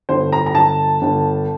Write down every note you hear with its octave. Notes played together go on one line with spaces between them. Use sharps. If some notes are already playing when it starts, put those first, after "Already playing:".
G1 C5
A#5
A#5
G1 A5
G1